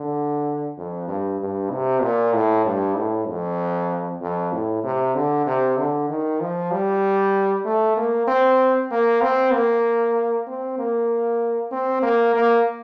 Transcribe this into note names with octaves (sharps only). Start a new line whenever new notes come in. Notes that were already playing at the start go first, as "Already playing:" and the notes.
Already playing: D3
F2
G2
G2
C3
A#2
A2
G2
A2
F2
F2
A2
C3
D3
C3
D3
D#3
F3
G3
A3
A#3
C4
A#3
C4
A#3
C4
A#3
C4
A#3
A#3